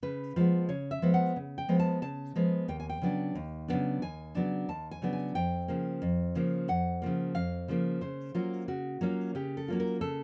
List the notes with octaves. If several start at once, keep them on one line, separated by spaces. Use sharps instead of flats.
C#3 B4
F3 G#3 B3
C#3 C#5
E5
F3 G#3 B3
F#5
C#3
G5
F3 G#3 B3
A5
C#3 A5
F3 G#3 B3
D#2 G5
G#5
G5
C#3 F#3 B3 D4
D#2
C#3 F#3 B3 D4
D#2 G#5
C#3 F#3 B3 D4
D#2 A5
G#5
C#3 F#3 B3 D4
G#5
F2 G5
C#3 F3 A#3
F2
C#3 F3 A#3
F2 F#5
C#3 F3 A#3
F2 F5
C#3 F3 A#3
C#3 C5
F#3 A#3 C#4 F4
C#3 F#4
F#3 A#3 C#4 F4
C#3 G4
A4
F#3 A#3 C#4 F4
A#4
C#3 A4